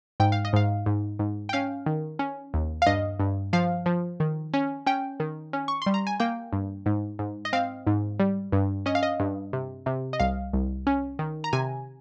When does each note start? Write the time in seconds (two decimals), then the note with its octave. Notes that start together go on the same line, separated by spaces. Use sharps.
0.20 G#2 G5
0.32 F5
0.45 D#5
0.53 G#2 F5
0.86 G#2
1.19 G#2
1.49 G5
1.53 C#4 F5
1.86 D#3
2.19 C#4
2.54 D#2
2.82 F5
2.87 G2 D#5
3.19 G2
3.53 F3 F5
3.86 F3
4.20 D#3
4.54 C#4
4.86 C#4 G5
5.20 D#3
5.53 C#4
5.68 C#6
5.82 G3 C6
5.94 A#5
6.07 G#5
6.20 A#3 G5
6.53 G2
6.86 G#2
7.19 G#2
7.45 D#5
7.53 C4 F5
7.87 G#2
8.20 G3
8.52 G2
8.86 C#4 D#5
8.95 F5
9.03 D#5
9.20 G2
9.53 C3
9.86 C3
10.13 D#5
10.20 C2 F5
10.53 C2
10.87 C#4
11.19 D#3
11.44 A#5
11.53 C3 G#5